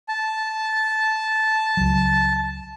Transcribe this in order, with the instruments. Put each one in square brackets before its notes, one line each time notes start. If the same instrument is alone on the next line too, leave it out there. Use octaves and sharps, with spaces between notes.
[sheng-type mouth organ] A5
[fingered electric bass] C#2 F#3